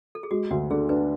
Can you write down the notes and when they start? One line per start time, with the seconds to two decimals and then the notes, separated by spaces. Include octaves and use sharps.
0.15 A4
0.23 G#4
0.31 G#3 F#4
0.51 D2 F#4
0.70 D3 G#4
0.89 D4 B4